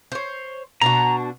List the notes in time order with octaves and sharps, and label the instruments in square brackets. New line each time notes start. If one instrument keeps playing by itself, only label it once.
[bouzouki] C5 C#5
[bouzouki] B2 D4 F#4 [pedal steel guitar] A#5